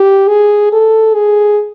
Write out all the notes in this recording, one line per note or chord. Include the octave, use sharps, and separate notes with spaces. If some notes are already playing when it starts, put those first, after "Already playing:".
Already playing: G4
G#4
A4
G#4